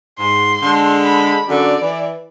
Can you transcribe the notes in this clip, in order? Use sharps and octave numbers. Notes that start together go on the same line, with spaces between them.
G#2 C6
D3 G#3
B5
F#2 D3 D5
E3